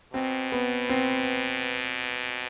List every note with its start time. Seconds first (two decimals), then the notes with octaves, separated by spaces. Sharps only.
0.13 B2 C4
0.52 B3
0.90 C4